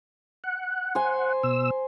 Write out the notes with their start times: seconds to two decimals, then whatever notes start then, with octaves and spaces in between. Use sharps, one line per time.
0.44 F#5
0.95 C5 G#5
1.43 B2 E6